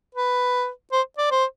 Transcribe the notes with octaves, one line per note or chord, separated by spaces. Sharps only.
B4
C5
D5
C5